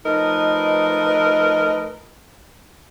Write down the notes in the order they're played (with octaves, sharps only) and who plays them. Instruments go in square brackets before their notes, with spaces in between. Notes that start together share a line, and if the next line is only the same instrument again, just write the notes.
[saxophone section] F3 A3 D#4 A#4 B4 D#5